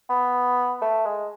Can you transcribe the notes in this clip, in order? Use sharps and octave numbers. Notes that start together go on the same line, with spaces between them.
B3
A3
G#3